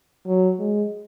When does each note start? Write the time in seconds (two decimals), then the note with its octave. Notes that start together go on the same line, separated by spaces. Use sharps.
0.26 F#3
0.59 G#3